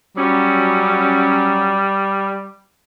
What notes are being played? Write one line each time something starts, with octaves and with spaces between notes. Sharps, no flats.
F#3 G3 C#4